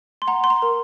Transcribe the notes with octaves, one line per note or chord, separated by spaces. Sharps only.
C6
F#5 A#5
C6
A#5
A#4